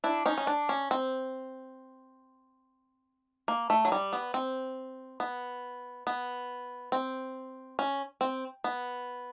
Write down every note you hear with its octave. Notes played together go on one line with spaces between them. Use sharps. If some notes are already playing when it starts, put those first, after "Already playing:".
D4 E4
C#4 D#4
C#4
D4
C#4
C4
A#3
A3
F#3
G3
B3
C4
B3
B3
C4
C#4
C4
B3